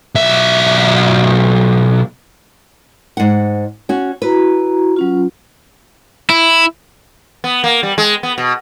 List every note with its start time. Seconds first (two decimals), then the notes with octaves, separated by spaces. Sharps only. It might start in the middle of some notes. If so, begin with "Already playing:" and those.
0.15 B1 E5
3.17 G#2 F#5
3.89 C#4 F#4
4.22 E4 F#4 B4 A#5
4.96 F#3 C#4 F4
6.30 E4
7.44 B3
7.64 A#3
7.83 G3
7.98 G#3
8.23 B3
8.38 B2